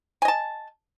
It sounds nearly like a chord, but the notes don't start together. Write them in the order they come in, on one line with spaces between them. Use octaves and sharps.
G#5 D#5 A5